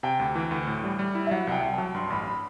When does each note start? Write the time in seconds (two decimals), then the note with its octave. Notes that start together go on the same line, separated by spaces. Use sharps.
0.03 C3 G5
0.20 D2
0.35 E3
0.51 D2
0.67 A2
0.84 G3
0.99 G3
1.15 E4
1.26 E5
1.31 F#3 F#5
1.47 C2 F#5
1.52 G5
1.63 C2
1.74 F#3 A5
1.94 G2 C6
2.10 A1 B5
2.27 B5